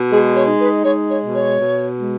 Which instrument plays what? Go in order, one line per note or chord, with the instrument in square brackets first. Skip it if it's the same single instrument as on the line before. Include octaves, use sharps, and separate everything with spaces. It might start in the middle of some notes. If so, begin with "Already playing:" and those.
Already playing: [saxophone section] B2
[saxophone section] G#3 [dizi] G#4
[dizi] C#5
[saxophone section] D#4
[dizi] B4
[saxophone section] G#3 [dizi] C#5
[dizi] C#5
[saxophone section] B2
[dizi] C#5
[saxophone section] B2
G#3